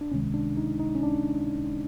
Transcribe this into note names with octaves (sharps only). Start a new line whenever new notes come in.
D4
C#2 C3 D#3 G#3 C#4
D4
D#4
D#4
C#4
D4